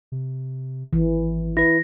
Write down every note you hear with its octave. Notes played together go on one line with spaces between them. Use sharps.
C3
G#1 E3
E4 B4 A#6